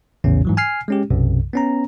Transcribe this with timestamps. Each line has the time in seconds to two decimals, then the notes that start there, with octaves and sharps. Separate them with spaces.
0.24 A#1 E2 A2 C#3 C#4
0.45 G#2 E3 F#3
0.57 G#5 F6 C7
0.88 G#3 C#4 G4
1.10 B1 F#2 C3
1.53 B3 C#4 A#5